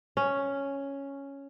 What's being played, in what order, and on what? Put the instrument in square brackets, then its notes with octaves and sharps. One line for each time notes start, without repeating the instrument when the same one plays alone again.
[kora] C#4